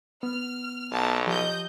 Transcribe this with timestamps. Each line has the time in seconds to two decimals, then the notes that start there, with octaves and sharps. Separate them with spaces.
0.23 B3 F6
0.92 B1 A5 A#5
1.27 F3 G4 D#5 G6